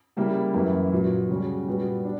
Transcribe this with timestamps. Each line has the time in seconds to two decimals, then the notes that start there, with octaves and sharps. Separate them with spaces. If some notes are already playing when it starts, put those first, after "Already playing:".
0.17 C#3 G3 A#3 E4 G4
0.54 F#2 E3 A#3 E4
0.92 A#2 F#3 B3 F#4
1.29 C#3 G3 C#4 F#4
1.67 A#2 G3 B3 F#4
2.04 D4